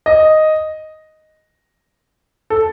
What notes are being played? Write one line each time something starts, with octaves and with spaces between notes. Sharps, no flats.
D#5
A4